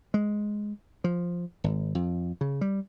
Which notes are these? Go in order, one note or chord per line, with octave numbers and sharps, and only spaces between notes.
G#3
F3
G#1
F2
C#3
G3